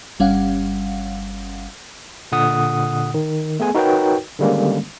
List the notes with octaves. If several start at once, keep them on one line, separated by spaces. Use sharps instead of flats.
G1 G3 C#4 F5 F#5
A#2 D3 F#5 D#6
D#3
A3 B3 G#4 G#5
D#4 F#4 A#4 B4 C#5 G5
D3 D#3 G3 G#3 A#3 C#4